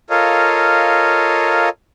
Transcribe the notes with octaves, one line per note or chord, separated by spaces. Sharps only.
F4 A4 A#4 C#5 D#5 F5